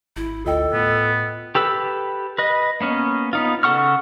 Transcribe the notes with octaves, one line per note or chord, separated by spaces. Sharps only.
G#1 E4
D2 F4 A4 D#5 G5
A2 B3
G4 A4 B4 E6
B4 D#5
A#3 B3 C#4
B3 D#4 F4
C#3 A4 F#5 C#6 F6